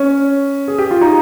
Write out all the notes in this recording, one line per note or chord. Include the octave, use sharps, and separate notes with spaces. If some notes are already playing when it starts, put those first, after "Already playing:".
Already playing: C#4
G#4
G4
F4
D#4